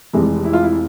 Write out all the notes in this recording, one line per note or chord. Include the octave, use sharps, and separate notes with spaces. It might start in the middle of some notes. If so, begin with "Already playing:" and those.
F1 F2 C3 E3 G#3
E4
F4
E4